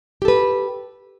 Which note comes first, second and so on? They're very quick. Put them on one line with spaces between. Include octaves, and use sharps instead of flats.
G4 A4 B4